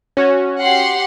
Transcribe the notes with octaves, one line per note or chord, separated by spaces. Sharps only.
C#4 F#4 C#5
G4 F#5 C6